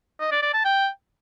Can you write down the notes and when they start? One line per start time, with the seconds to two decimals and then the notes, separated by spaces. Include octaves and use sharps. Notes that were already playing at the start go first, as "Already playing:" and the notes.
0.20 D#5
0.31 D5
0.42 D5
0.53 A5
0.65 G5